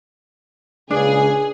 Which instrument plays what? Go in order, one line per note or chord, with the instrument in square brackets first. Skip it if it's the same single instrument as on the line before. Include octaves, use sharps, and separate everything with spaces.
[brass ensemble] C#2 A#2 C#3 [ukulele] D4 [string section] G#4